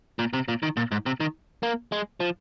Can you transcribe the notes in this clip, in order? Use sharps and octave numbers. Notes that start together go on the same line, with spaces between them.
A#2
C3
A#2
D#3
A#2
G#2
C3
D#3
A#3
G#3
F3